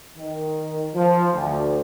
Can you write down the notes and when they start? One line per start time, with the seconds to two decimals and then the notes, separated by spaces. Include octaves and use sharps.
0.17 D#3
0.95 F3
1.33 D2